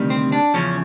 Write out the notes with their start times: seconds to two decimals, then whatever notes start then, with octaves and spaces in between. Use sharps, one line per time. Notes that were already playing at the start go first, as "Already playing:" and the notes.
Already playing: D2 C3 D#3 G3
0.10 C4
0.32 D4
0.54 E2 C#3 F3 C#4